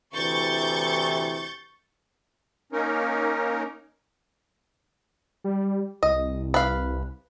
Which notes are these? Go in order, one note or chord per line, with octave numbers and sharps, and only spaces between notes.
D2 C3 E3 C#6 G6 A6
A#3 C#4 D#4 A#4
G3
C2 D#5
B4 F5